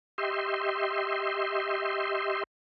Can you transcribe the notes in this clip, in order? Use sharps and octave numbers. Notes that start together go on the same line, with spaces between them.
G4 D#5 E5 C6